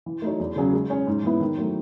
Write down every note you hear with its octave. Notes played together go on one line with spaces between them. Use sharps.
E3
A3 D#4 F#4 C#5
E2
C#3 F#3 C#4 G#4
G#3
C#4 G#4 C#5
G#2
E3 B3 E4
D#3
F#3 A3